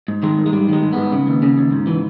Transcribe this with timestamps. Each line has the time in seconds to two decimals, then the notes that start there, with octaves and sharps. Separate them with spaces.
0.08 G#2
0.23 D#3 G#3
0.38 G#2
0.46 G#3
0.53 G#2 G3
0.68 D#3 G#3
0.83 G#2
0.93 B3
0.98 G#2
1.12 C#3
1.27 D#2
1.43 C#3
1.58 D#2
1.72 G#2
1.87 E3